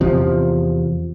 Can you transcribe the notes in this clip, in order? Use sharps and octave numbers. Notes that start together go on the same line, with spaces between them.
E2 C3 F3